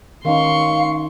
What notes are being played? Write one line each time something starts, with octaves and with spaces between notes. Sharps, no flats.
D#3 C#4 D#4 F5 C6 C#6